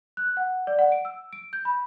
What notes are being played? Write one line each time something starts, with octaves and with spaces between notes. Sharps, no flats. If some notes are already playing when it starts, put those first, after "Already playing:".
F#6
F#5
D5
F#5
D7
E6
D7
G6
B5